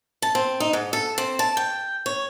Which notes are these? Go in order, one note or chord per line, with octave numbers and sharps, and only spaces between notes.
A5
C4
D#4
G#2
A4
C4
A5
G5
C#5